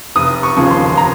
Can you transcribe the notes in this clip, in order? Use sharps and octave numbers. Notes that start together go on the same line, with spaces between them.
F1 D#6
C#6
D#2 C#3 F3
C6
A#5